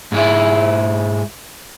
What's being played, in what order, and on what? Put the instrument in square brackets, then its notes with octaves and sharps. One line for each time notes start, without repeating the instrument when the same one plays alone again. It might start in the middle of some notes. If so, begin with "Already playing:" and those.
[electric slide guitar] G#2 G#3 E4